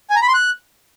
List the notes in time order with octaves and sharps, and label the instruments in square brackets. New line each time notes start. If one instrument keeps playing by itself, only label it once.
[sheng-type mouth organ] G#5
A#5
B5
C6
F#6